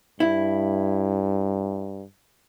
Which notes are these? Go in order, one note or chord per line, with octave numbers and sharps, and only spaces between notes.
G2 E4